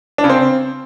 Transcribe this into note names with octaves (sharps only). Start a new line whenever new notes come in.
D4
C#3
C4